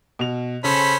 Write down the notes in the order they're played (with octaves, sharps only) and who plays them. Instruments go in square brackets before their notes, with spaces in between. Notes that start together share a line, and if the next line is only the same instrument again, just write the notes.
[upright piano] B2 F7
[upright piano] C#3 [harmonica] C#4 A4 C5 [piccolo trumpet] B5